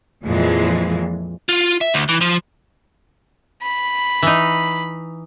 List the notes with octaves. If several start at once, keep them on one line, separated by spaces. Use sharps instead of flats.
F2 A#2 E3 F3 G#3
F4
E5
D2
E3
F3
B5
E3 D#4